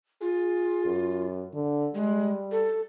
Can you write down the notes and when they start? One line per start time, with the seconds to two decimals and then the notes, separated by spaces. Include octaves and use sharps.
0.21 F4 G#4
0.86 F#2
1.54 D3
1.95 G3 G#3
2.51 A4